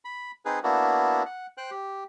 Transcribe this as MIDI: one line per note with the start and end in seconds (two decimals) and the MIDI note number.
0.05 0.31 83
0.45 0.59 60
0.45 0.59 63
0.45 0.59 68
0.45 0.59 71
0.64 1.23 58
0.64 1.23 59
0.64 1.23 62
0.64 1.23 64
0.64 1.23 66
1.26 1.46 78
1.57 1.70 72
1.57 1.70 79
1.57 1.70 90
1.71 2.04 67